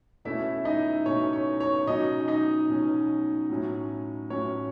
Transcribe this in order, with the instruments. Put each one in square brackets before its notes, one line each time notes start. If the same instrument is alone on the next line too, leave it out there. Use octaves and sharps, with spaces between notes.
[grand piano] B2 A3 C#4 E4 E5
D#4 D#5
B2 A3 C#4 C#5
C#5
C#5
B2 F#3 C#4 D#4 D#5
D#4 D#5
B2 F#3 C#4
A2 F#3 C#4
A2 F#3 C#4 C#5